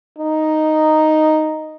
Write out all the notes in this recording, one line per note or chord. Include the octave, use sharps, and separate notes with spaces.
D#4